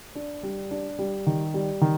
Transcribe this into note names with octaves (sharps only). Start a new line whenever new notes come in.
D4
G3
D4
G3
D#3
G3
D#3